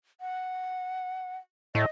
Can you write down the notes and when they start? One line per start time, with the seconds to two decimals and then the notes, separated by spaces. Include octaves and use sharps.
0.21 F#5
1.75 A2 D#5